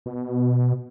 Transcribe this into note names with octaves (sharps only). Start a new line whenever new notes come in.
B2